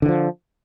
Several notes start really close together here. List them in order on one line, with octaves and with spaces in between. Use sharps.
D3 E3 F3